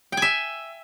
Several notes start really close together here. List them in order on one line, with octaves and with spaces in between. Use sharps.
G5 G#5 E5